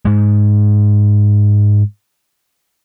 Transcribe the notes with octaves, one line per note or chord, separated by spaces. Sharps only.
G#2 G#3